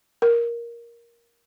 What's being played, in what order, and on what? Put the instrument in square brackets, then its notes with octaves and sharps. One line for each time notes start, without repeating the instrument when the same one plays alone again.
[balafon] A#4